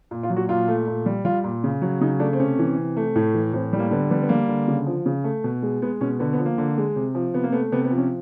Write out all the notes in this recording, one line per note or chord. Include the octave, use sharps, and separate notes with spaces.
A#2
F4
F#3
F#4
A#2 F4
A3
A#2
G3
G3 F4
A#2
C#3
F#3
C#3 D#4
A3 D4
C4
C3 C#4
E3
C3
A3
A2
E3
A2 C4
G3
A#3
D3 B3
G3 B3
B3
G3 A#3
D3
C#3
F3
C#3
A3
B2
G#3
G#3 B3
B2 C#4
D3 B3
B3
F3
A#3
D3
G#3
C3
F3
C3 B3
A#3
A3 B3
C3 B3
B3
F3
C#4